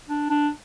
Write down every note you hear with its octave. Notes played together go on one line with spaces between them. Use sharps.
D4
D4